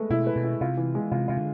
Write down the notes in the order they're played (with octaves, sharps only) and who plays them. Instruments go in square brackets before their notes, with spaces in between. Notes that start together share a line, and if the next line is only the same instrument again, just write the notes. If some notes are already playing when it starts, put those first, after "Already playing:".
Already playing: [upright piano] G#3 A3 B4
[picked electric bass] B2 [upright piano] E4
[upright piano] B4
[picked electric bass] B2
[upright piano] E4
[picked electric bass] C3 [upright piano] F4
[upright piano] E3
G#3
[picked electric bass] C3 [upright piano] F4
[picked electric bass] C3 [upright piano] F4
[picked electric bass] D3